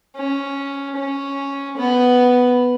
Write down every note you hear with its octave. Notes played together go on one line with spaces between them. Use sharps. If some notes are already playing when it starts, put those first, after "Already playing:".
C#4
C#4
B3